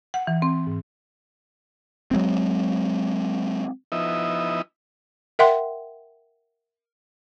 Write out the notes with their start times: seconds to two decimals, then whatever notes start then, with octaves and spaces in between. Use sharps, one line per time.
0.14 F#5
0.27 E3
0.42 C4
0.67 G#2
2.11 F#3 G#3 C4
3.92 F3 B3 D#4 E4 D#5 E5
5.39 A#4 E5 F#5 G5 C6